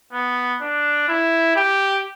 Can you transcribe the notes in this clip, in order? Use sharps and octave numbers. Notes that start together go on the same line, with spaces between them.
B3
D4
E4
G4